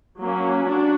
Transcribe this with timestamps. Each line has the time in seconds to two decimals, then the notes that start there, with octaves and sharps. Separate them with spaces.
0.19 F#3 A#3 C#4
0.66 D4 F#4